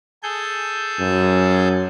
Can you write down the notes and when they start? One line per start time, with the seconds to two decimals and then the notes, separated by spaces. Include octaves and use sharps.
0.23 G#4 A4 G6
0.99 F#2